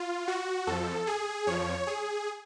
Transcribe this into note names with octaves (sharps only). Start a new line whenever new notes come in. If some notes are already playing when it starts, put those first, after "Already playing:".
Already playing: F4
F#4
F2 F3 A4
G#4
F2 F3 C#5
G#4